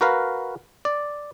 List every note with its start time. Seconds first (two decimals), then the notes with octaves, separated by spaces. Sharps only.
0.01 F#4 A#4 B4 F5
0.85 D5